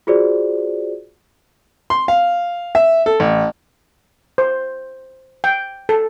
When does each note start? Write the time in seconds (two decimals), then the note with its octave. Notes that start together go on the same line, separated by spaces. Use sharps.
0.07 F4 F#4 G#4 C5 D5
1.90 C6
2.08 F5
2.75 E5
3.06 A4
3.20 A1
4.38 C5
5.44 G5
5.89 A4